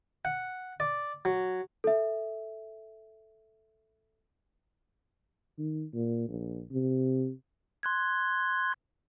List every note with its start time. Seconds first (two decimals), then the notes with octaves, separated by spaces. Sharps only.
0.25 F#5
0.80 D5
1.25 F#3
1.84 A4 E5
5.59 D#3
5.94 A#2
6.28 A#1
6.71 C3
7.83 C6 F#6 G#6